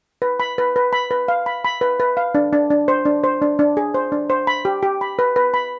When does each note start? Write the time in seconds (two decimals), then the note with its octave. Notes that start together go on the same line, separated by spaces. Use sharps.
0.22 B4
0.40 B5
0.58 B4
0.76 B4
0.93 B5
1.11 B4
1.28 F5
1.46 B5
1.65 B5
1.81 B4
2.00 B4
2.17 F5
2.35 D4
2.53 D4
2.70 D4
2.88 C5
3.05 D4
3.24 C5
3.42 D4
3.59 D4
3.77 G#4
3.94 C5
4.12 D4
4.30 C5
4.47 B5
4.65 G4
4.83 G4
5.01 B5
5.19 B4
5.36 B4
5.54 B5